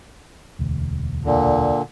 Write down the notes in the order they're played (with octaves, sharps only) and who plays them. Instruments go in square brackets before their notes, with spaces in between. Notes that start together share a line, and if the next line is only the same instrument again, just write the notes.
[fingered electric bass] E1 D2
[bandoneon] A#2 D3